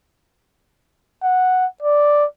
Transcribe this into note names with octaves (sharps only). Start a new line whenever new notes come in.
F#5
D5